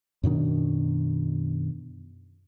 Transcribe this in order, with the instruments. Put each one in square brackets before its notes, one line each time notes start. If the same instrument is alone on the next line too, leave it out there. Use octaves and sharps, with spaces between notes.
[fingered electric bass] F#2 B2 D#3 D4